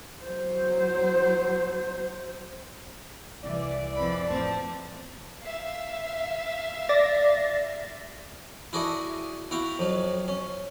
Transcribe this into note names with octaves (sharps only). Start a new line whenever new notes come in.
F#3 C5
C2 E3 D5
F2 E3 B5
A1 F3 C4 C#4 A5
E5 F5
D5 A6 A#6
E4 F#4 G#4 A4 D5 D#5
E4 F#4 F5 G5
F2 F#3
C#4